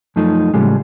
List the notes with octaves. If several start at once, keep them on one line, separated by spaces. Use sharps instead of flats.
F#2 F3 A3 D#4
A2 C#3 F3 G3 G#3